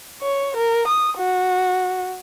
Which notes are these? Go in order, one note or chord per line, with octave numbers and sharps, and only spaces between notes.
C#5
A#4
D#6
F#4